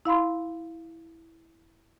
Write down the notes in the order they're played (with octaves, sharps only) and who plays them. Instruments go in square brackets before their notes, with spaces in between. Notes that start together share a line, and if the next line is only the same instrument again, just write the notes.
[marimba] E4 F5 B5 C6